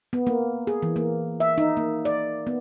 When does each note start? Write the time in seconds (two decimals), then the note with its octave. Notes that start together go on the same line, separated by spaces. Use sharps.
0.13 B3
0.27 A#3
0.67 G#4
0.82 E3
0.96 A#3
1.40 E5
1.58 D#4
1.77 A#3
2.05 D5
2.47 B3